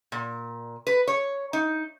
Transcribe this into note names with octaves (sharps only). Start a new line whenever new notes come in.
A#2
B4
C#5
D#4